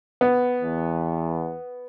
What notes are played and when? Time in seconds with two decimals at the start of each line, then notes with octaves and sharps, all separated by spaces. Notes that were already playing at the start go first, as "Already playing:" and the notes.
0.21 B3
0.61 E2